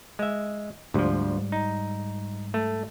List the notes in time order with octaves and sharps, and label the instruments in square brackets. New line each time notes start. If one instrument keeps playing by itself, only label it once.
[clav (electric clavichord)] G#3 E5
[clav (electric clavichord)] D2 F3 [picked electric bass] G#2 G3
[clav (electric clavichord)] D#4
A3